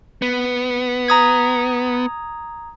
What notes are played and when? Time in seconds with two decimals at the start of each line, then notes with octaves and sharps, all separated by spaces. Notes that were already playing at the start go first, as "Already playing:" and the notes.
0.22 B3
1.08 A#5 D#6 G#6